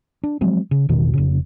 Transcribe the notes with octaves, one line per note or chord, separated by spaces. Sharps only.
D4
F3 F#3 G#3 C4
C#3
A1 E2 B2 D#3
F1 C#3